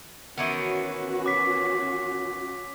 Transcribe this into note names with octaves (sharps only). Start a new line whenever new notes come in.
D#3 E3 B3 C#4 F#4
D6 B6